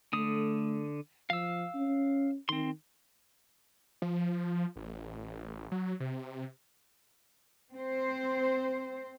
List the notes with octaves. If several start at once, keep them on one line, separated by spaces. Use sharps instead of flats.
D3 A3 D#6
F3 F5 E6
C#4
D#3 C4 C6
F3
A1
F#3
C3
C4 C5